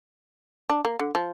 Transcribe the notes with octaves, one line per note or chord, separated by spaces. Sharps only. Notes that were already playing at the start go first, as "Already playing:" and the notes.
D4
A#3
D3
F3